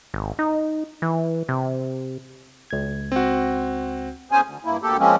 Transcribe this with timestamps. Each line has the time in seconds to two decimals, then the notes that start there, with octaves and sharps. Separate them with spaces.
0.14 G#1
0.39 D#4
1.02 E3
1.49 C3
2.71 C#2 G#6
3.12 C4 F#4
4.31 E2 C#4 G#4 C5 G#5
4.43 D2
4.65 G2 A#3 E4
4.82 D2 A#3 G4 A4
4.99 F3 G#3 A#3 C4 C#4